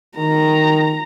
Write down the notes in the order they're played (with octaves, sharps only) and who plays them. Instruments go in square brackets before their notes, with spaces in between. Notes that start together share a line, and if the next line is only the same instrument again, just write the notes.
[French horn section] D#3 [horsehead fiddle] A#5